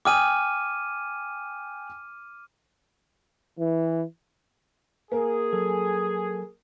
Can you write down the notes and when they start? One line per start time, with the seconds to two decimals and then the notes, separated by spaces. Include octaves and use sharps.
0.05 G5 G#5 D6 D#6 F6 D#7
3.59 E3
5.12 A#3 G#4 A#4
5.53 F#3 A4